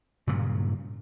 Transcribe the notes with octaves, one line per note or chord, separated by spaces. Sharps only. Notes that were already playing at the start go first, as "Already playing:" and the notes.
G2 A#2 C#3 F#3